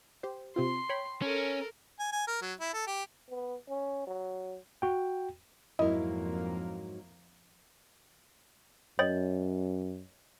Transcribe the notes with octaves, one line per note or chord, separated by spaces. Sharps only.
G4 C5
C3 C4 F4 C6
C#5 G5 B5
C#4 A4 A#4
G#5
G#5
A#4
F#3
E4
A4
G4
B3
C#4
F#3
F#4 G5
F2 G#2 F#3 A#3 E4 A#4 D#5
F#2 C#5 D#5